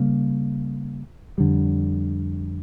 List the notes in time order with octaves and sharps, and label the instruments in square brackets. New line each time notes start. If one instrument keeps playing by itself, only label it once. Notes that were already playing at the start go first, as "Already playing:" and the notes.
Already playing: [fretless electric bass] C#3 G3 A#3
F2 D3 G3